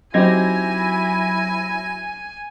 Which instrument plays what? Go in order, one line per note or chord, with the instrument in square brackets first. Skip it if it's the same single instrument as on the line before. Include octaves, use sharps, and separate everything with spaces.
[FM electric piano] F#3 G#6 A#6 [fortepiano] C4 D#4 G4 [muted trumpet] E4 [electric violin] G#5